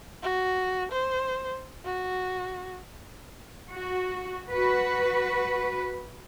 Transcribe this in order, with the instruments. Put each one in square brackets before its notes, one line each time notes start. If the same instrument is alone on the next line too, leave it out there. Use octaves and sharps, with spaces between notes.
[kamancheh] F#4
C5
F#4
[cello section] F#4
F#4 B4